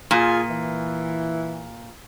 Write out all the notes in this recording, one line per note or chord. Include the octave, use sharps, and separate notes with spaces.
A#2 F4 G#4 G#5
E3